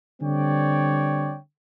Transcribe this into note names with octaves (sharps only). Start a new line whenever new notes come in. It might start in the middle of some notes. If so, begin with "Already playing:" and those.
D3 G3 C4 C#5 D5 G5